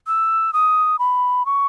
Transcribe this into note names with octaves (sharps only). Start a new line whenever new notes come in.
E6
D#6
B5
C#6